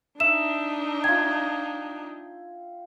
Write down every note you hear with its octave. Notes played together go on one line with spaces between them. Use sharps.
D4 D#4 E5 E7
F4 G5 G#6